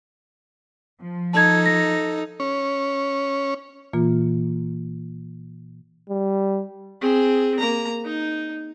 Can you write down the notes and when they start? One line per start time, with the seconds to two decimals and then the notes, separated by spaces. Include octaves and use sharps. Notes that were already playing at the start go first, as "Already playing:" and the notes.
1.03 F3
1.33 D#4 A4 A5 G#6
1.66 A#6
2.40 C#4
3.93 A#2 E3 A#3 F4
6.10 G3
7.02 C4 G#4
7.59 A#3 A#5
8.05 D#4